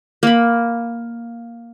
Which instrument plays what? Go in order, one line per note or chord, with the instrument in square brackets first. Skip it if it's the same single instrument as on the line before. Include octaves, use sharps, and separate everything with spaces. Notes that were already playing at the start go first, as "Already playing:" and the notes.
[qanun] A#3 B5